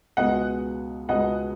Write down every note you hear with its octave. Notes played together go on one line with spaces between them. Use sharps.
C#2 B2 G#3 B3 D#5 F#5
C#2 B2 G#3 B3 D#5 F#5